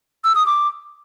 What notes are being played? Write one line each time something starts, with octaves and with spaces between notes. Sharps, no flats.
E6
D#6
D6